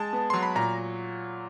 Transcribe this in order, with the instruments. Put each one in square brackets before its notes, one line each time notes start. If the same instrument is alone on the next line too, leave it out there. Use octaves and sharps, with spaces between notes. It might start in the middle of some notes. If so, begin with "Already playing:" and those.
Already playing: [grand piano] G#3 [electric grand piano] A5
[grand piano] B3
[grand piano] F#3 [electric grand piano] C6
[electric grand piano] B5
[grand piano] A#2 [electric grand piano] A#5